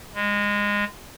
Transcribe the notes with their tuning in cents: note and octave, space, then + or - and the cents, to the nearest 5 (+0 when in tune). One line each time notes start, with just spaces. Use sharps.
G#3 -20